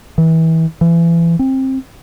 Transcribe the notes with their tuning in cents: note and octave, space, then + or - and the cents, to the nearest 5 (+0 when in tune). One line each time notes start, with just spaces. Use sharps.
E3 -30
E3 +30
C4 +20